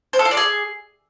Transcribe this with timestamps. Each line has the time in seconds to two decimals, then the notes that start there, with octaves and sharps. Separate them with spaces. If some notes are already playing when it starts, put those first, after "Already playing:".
0.13 C5
0.19 A4
0.25 F4
0.31 D5
0.37 G#4